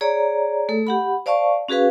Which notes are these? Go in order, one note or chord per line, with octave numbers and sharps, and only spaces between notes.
G#4 C#5 D5 A#5
A3 A4
G4 F#5 B5
C5 D5 F5 A5 C#6
C#4 F#4 G#4 B4 F5